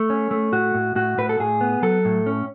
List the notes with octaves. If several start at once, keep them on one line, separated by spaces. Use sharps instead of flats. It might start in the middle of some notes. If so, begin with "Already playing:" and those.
Already playing: A3
C#4
A3
A2 F#4
A2
A2 F#4
A2 B4
A4
A2 G#4
B3
F#3 A4
A2
C#4